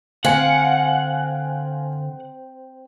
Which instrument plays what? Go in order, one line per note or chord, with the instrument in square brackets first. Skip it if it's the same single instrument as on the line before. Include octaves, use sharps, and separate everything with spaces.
[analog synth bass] D3 [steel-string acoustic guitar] C4 [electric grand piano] F5 G#5 C#7 [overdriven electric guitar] F#5